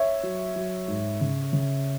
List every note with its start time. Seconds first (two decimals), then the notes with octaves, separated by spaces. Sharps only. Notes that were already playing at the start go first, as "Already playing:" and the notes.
Already playing: C#5 E5
0.23 F#3
0.56 F#3
0.88 G#2
1.21 C#3
1.53 C#3